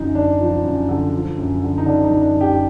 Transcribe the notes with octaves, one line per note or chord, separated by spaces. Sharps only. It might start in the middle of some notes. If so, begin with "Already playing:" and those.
Already playing: F#2 D3 D#4
F#2 D4
F3
F#2
D3
F3
F#2
D3
D#4
D3 D4
D#4
F#2
D4
F#2
G4